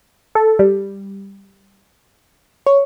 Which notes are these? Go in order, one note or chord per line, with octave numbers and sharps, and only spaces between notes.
A4
G3
C#5